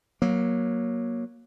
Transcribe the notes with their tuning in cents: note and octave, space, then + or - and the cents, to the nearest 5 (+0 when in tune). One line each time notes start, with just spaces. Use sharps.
F#3 +0 A#3 +20